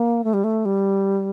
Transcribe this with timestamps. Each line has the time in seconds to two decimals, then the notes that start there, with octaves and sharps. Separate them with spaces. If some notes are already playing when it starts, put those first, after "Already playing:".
Already playing: A#3
0.24 A3
0.33 G3
0.44 A3
0.65 G3